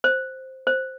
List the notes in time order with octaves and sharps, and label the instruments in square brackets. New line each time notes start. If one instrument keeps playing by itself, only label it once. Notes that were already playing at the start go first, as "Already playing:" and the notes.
[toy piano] C5
C5